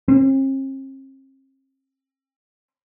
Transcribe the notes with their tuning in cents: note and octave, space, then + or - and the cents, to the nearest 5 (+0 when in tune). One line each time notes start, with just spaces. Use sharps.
C4 +45